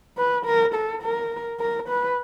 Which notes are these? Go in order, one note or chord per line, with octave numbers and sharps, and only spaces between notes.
B4
A#4
A4
A#4
A#4
B4